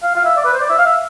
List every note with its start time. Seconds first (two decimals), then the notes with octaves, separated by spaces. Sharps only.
0.03 F5
0.15 F5
0.25 E5
0.37 D5
0.45 B4
0.54 C5
0.61 D5
0.70 E5
0.78 F5
0.86 E5